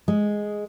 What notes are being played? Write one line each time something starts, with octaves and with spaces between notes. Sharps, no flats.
G#3